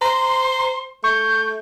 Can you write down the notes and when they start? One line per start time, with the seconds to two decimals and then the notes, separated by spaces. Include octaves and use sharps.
0.01 C5 A#5 C6
1.04 A3 C#6 G6